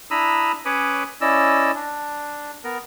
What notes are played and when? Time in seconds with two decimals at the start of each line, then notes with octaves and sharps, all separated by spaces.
0.11 D4 E4 A#5 B5 D#6 E6
0.65 C#4 B4 C#5 B5 D6 D#6
1.21 C#4 E4 D5 D#5 E6
1.75 D4
2.64 B3 A#4